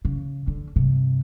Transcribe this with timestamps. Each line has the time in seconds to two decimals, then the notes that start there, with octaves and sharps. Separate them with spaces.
0.05 C#3
0.47 D3
0.76 G2 C3